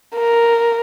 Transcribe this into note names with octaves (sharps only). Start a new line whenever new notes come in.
A#4